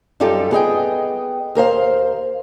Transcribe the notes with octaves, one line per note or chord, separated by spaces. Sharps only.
F#2 G3 D#4 F4 G4 A4
B3 G#4 D#5 G5
D#2 A#4 C5 F5